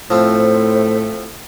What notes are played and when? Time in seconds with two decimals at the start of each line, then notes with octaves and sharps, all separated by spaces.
0.10 A2 F3 A3 C4 C5